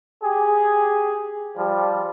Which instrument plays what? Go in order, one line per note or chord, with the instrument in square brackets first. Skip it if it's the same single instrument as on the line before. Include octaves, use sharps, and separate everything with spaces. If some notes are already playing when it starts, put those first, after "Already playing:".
[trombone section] G4 G#4
F3 G3